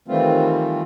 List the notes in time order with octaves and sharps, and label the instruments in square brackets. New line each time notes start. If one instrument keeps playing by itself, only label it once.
[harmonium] D#3 E3 G3 A3 C4 F4